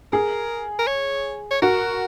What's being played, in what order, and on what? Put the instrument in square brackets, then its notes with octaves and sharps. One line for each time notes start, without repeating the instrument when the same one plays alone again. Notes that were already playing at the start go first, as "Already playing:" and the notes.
[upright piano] G#4 [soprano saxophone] A#4
[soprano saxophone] A#4
C#5
C#5
[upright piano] F#4 [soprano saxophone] A#4